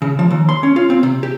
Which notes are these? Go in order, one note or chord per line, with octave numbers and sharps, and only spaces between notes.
C#3
F3
D#2
C6
C#4
F4
C4
C3
G4